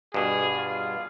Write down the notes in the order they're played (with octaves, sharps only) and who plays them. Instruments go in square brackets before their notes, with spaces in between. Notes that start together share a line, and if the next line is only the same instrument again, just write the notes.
[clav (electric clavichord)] G2 B2 [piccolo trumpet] G#4
[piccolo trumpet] F4